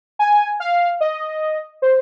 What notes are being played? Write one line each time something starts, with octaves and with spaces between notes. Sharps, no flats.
G#5
F5
D#5
C5